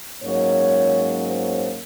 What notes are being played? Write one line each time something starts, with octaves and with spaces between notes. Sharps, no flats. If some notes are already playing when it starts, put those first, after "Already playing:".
G#2 F#3 A#3 C#4 C#5
C5